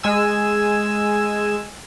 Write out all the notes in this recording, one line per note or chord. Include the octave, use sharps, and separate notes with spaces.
G#3 G#5 E6